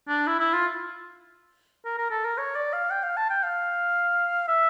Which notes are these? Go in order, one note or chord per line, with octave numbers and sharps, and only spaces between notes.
D4
E4
E4
F4
A#4
A#4
A4
A#4
C#5
D5
F5
G5
F5
A5
G5
F5
E5